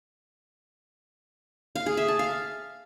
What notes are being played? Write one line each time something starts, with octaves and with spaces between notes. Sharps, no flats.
F5
G#4
E5
A5
F5